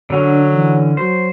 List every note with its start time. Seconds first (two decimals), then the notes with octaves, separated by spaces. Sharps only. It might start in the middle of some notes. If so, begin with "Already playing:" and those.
0.10 D3 F#3 C#4 D4
0.52 E3
0.97 F#3 C5